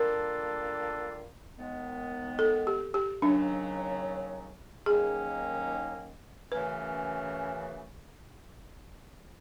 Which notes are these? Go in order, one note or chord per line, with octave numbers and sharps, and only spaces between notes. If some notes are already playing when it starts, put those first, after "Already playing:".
Already playing: G3 A#3 D4 F4 A4 A#4
D#2 D#3 G#3 B3
A4
G4
G4
D#2 C#3 F#3 D4
D#2 D#3 F#3 A#3 C#4 G#4
F#2 C#3 E3 A3 C#4 B4